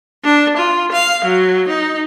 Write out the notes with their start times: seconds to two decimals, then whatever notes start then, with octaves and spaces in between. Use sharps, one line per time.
0.24 D4
0.56 F4
0.92 F5
1.23 F#3
1.67 D#4